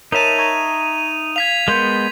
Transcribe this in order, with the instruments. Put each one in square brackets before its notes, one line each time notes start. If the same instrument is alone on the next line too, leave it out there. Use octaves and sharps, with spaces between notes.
[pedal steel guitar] D#4 E5 A5 [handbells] A#4 C#5 A#5 [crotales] D#7 F7
[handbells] A#5 C#6 G#6
[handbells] F5 [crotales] G#6 B6 F7
[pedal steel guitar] G#3 B3 [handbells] A#4 C6 G6